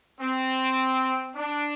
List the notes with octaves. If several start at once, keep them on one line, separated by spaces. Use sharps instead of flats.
C4
D4